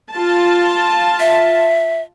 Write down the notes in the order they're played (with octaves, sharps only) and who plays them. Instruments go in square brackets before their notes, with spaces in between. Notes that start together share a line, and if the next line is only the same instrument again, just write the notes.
[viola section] F4 A5
[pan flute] E5